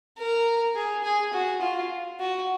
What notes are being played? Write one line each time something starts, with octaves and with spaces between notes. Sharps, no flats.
A#4
G#4
G#4
F#4
F4
F#4